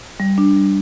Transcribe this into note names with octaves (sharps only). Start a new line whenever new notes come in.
G3
D4
G3